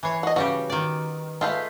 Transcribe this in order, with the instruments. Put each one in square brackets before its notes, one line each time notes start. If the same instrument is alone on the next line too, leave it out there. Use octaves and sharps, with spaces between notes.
[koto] E3 C#5 [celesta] G#5 B5 C7
[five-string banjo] F#4 D#5 [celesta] F#5
[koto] C#3 G3 G4 [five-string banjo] F#4 [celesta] B4
[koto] D#3 D5
[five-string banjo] G#3 A3 B4 [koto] F4 [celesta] F5 G6